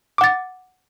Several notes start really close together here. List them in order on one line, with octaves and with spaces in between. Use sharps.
D6 F#5 A6